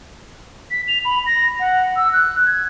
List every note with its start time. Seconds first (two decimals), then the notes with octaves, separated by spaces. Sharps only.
0.71 B6
0.88 F7
1.05 B5
1.26 A#6
1.59 F#5
1.96 E6
2.13 F#6
2.46 G#6